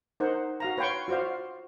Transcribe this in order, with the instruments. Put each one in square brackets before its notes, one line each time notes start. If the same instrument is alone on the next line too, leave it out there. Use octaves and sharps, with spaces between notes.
[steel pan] D#4 A#4 C5 F#5
F#4 F5 A#5
B4 C#5 F5 G5 C6 C#6
F4 F#4 C5 D5 F5